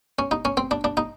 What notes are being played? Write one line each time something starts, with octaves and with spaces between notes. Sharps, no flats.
C#4
D#4
C#4
C4
D4
D4
D#4